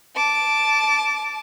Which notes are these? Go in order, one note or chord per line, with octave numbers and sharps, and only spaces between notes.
A5 D6